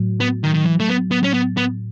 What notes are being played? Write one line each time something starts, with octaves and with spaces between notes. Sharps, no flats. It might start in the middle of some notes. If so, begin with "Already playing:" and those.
Already playing: A2 F#3
B3
D#3
D#3
E3
A3
B3
B3
C#4
B3
B3